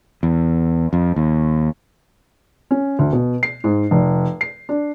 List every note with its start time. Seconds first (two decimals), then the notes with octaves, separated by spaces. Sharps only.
0.23 E2
0.93 F2
1.16 D#2
2.71 C#4
2.99 D2
3.13 B2
3.43 C7
3.64 G#2
3.91 F1
4.41 C7
4.69 D4